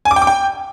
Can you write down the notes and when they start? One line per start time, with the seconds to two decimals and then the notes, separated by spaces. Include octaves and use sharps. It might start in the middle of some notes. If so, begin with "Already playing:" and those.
0.05 G#5
0.11 D6
0.16 G5
0.22 D6
0.27 G5